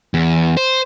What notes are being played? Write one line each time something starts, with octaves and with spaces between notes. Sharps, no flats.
E2
C5